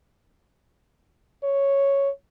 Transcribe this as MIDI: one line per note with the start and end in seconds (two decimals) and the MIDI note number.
1.44 2.09 73